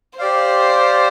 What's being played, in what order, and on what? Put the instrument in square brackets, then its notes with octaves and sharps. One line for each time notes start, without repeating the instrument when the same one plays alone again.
[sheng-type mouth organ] G4 D5 F5 [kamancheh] C5